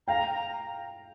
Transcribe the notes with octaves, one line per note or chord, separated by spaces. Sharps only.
F5 G5 A#5
A#5